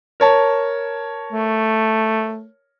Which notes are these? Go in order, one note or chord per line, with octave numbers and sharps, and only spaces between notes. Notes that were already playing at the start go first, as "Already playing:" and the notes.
A#4 C#5 A5
A3